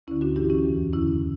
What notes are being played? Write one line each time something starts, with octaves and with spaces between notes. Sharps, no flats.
D2 D3 C#4 E4
D4 F#4
G2 E3 E4 G4
C#4 E4
E2 C#3 E3
E2 D3 C#4 E4